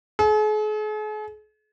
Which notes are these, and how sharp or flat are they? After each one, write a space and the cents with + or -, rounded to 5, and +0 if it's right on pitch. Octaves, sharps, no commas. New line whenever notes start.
G#4 +45